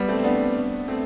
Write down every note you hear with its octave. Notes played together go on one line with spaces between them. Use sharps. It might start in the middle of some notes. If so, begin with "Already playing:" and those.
Already playing: G3 B3
A3 C4
C4
B3 D4
A3 C4